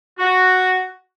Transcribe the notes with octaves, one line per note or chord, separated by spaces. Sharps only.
F#4